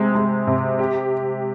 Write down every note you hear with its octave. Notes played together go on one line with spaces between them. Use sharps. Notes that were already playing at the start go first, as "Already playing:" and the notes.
Already playing: C3 G#3
G#3
C3
G4